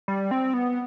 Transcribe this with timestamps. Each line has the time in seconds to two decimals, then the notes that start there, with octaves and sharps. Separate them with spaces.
0.08 G3
0.31 C4
0.54 B3